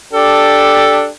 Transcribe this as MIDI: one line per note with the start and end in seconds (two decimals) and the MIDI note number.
0.13 1.08 62
0.13 1.08 67
0.13 1.08 69